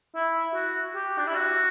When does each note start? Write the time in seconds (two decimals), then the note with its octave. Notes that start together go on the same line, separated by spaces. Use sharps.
0.15 E4
0.54 F#4
0.95 G4
1.18 D4
1.27 E4
1.35 F#4